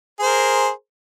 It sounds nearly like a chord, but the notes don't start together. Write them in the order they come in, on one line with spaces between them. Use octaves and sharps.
G#4 C5 A#4